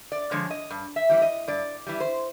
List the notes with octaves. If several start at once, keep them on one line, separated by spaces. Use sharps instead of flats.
D5
D3 F3 G#3 C#5
D#5
G2
E5
E3 G3
D#5
G2 D5
E3 G3
C5